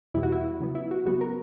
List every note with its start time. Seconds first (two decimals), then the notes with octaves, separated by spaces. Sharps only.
0.14 E2 B2 G3 B3 E4
0.23 F#4
0.32 E4
0.60 C#3 F#3 B3
0.75 E4
0.91 F#4
1.06 C#3 F#3 B3 F#4
1.21 A#4